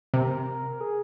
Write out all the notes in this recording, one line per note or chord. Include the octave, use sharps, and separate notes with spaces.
C3 A#4
G#4